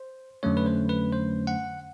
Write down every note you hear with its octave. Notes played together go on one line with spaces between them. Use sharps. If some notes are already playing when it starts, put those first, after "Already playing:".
Already playing: C5
F2 D3 F#3 A3 C#4 C#5
B4
C5
B4
C5
F#5